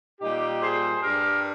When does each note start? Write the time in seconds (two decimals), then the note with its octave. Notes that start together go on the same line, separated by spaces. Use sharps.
0.21 A#2 G3 D#4 G4
0.62 G#4 C5
1.03 G2 G3 G4 A#4